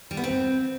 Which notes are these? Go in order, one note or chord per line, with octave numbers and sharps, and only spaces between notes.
G3
B3
C4